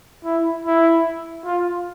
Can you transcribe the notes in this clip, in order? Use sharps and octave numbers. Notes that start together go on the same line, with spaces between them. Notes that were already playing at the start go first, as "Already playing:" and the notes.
E4
E4
F4